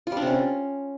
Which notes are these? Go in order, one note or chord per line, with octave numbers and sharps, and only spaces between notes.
F4
G3
D4
C3
C#4